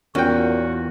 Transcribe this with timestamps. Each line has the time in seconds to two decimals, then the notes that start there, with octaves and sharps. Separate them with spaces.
0.15 E2 A#2 C#4 F#4 G5